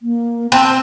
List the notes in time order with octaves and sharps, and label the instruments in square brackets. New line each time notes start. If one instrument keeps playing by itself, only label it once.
[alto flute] A#3
[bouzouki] C4 [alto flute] A5